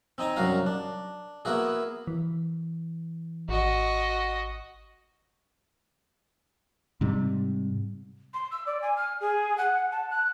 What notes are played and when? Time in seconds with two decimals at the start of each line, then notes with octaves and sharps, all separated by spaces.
0.18 C4 D#4 G#5 A#5
0.36 C2 F#2 F#3 F#4 F5 A#5
0.66 D4
1.45 A#3 B3 E4 F#4 G#4
2.07 E3
3.49 G#1 F#4 D#5
7.01 G#2 C3 G3
8.34 C6
8.51 E6
8.66 D5
8.82 G#5
8.97 F6
9.21 G#4
9.58 F#5
9.92 A5
10.10 F#6